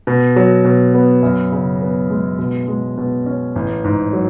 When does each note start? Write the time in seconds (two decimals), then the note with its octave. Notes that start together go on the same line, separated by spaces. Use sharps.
0.07 B2
0.36 F#3
0.65 B2
0.94 B3
1.23 F#2
1.52 C#3
1.81 B3
2.10 G#3
2.39 B2
2.68 G#3
2.98 B2
3.26 C#4
3.56 A1
3.84 G#2
4.13 F#3